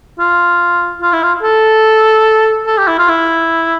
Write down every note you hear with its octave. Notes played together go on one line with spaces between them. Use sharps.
F4
F4
E4
F4
A4
A4
G4
E4
F4
E4